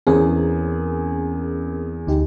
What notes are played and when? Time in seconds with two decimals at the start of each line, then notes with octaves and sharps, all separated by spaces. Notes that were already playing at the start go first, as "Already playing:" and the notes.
0.07 E2 C4 C#4 G#4 A#4
2.07 D2 D#4 G4